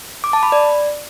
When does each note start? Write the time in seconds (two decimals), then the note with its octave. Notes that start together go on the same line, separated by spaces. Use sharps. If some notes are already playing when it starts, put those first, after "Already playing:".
0.24 D6
0.33 A5
0.43 B5
0.52 D5